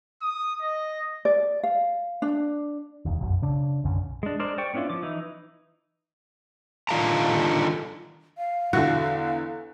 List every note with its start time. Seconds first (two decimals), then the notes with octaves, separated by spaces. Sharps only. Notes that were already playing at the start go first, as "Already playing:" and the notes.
0.22 D#6
0.62 D#5
1.25 D5
1.63 F5
2.22 D4
3.05 E1 D#2
3.19 F1 B1 F#2
3.42 C#3 D4
3.84 B1 F#2 D3 C#4
4.23 G#3 D4
4.39 G#3 D4 A#4 C5 D5
4.58 C5 D5 G5 C#6
4.74 B3 C#4 D4 E4 F4
4.90 F3 D6
5.03 E3 D#4 E4
6.89 D3 D#3 F4 F5 A5 A#5
8.37 F5
8.73 E2 D3 E4 F#4